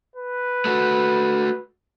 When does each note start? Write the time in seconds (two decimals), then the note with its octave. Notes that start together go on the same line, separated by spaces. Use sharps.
0.16 B4
0.65 A3 F#4